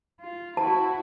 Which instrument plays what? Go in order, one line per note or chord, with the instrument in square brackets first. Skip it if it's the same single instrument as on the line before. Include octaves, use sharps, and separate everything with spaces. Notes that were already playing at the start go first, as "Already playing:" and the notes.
[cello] F4
[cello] E4 F#4 [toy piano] A5